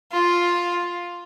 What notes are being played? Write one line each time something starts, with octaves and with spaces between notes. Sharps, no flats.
F4